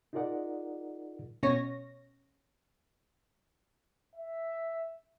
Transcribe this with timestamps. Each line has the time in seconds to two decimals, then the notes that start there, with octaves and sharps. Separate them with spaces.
0.13 D#4 F4 G#4 A#4 D5 F#5
1.43 B2 C#4 C#5 A#6
4.15 E5